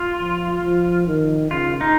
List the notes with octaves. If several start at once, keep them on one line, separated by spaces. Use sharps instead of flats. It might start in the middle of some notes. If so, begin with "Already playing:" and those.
Already playing: F4
F3
F3
D#3
C#3 F4
D#4